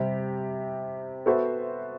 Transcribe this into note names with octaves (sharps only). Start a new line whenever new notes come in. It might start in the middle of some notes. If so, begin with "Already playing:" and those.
Already playing: C3 G3 C4 G4
B3 F#4 A4 C5 E5